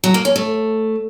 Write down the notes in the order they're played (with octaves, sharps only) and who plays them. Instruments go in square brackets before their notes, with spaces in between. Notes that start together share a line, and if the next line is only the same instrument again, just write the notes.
[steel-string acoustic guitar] F#3
A#3
C#4
A3